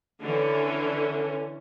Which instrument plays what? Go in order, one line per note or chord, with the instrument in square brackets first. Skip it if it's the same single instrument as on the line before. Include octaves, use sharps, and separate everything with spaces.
[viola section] D3 E3 C#4